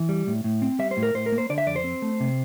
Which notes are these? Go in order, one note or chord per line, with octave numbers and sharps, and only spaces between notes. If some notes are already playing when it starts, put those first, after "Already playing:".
Already playing: E3
G3
A2
A2
C4
G3 E5
C5
A2
A#4
A2 C5
A#4
A#3
C5
D3 D5
E5
F2 D5
C5
C4
A3
C3